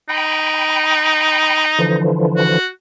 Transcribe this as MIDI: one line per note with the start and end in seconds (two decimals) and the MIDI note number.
0.09 2.12 63
0.09 1.66 79
0.09 1.66 83
1.79 2.59 50
1.79 2.59 52
1.79 2.59 53
2.37 2.68 66